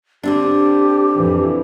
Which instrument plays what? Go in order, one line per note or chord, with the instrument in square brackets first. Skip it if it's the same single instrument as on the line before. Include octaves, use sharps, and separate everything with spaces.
[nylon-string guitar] D3 C4 D4 [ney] G4
[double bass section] F2 E3